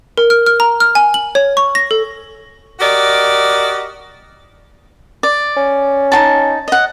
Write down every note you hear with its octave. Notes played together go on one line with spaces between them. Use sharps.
A#4
F6
F6
A#5
F6
G#5
F#7
C#5
C#6
A#6
A4
F#4 G4 A#4 D5 D#5
D5
C#4
D#4 F#4 A5
D#5 F#5